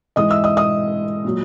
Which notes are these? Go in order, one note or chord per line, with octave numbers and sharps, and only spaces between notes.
G#2 E3 G#3 D#5 D#6
E5 E6
D#5 D#6
D#5 D#6
A#2 F#3